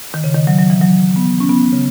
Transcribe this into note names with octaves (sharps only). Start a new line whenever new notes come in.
D#3
C#3
D#3
F#3
F#3
E3
F#3
B3
C#4
B3
C#3